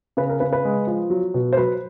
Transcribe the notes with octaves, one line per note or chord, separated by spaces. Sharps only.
C#3 B4
A#4
C#3 B4
B4
G#3
F3
F#3
B2
C5
F#3 B4